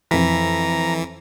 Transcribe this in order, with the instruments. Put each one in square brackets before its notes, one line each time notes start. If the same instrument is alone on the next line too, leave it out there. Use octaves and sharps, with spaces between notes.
[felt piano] F2 B6 [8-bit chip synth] E3 [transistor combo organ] A#5